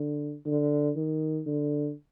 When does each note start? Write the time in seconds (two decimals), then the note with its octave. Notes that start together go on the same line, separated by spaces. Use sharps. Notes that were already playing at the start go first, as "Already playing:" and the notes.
Already playing: D3
0.45 D3
0.96 D#3
1.46 D3